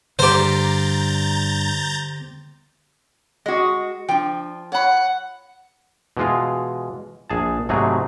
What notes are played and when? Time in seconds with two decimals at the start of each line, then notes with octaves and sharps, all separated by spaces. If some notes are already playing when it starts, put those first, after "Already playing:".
0.19 G2 D3 G4 C5 A#5 G6 A6
3.46 G#3 F#4 D#5
4.09 F3 D4 G5
4.72 C#5 F#5 B5
6.17 B2 E3 G#3 F4
7.30 A#1 G#4 A5
7.69 G#2 C3 F#3 A3 C4 G#4